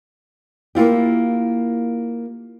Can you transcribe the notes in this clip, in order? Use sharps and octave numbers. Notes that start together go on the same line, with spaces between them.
A#3 E4 F4 G4